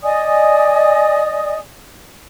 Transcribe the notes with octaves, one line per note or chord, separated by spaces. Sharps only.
D5 D#5 G#5 D#6